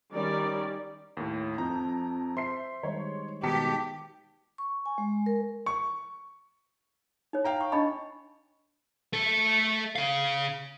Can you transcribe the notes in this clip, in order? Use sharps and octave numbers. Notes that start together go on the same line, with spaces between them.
D#3 G3 C#4 A#4 D5
D#2 A2
F2 A#5 G6
C5 E5 C6 C7
D#3 G3 G#3 C#5
B2 D#3 G#3 G4 A5 B6 C#7
C#6
G#5
G#3
A#4
C#6
D#4 C#5
F5 G5 A#5
C#6
D4 D#5 A5 B5 C#6
A3 A4
C#3 F5